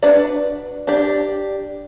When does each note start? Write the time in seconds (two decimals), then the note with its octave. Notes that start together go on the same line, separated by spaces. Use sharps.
0.03 D4 F#4 B4 D5
0.87 D4 G4 D5